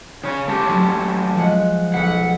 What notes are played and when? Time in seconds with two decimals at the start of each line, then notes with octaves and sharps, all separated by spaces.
0.24 C#3 C#4
0.48 A3 C#4 G4
0.68 F#3
1.35 F3 G#3 F#5
1.94 B1 F#5 B6